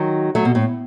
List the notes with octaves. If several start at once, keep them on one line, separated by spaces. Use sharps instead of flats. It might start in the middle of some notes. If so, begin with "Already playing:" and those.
Already playing: D#3 F#3
F#3 A3
B2
A2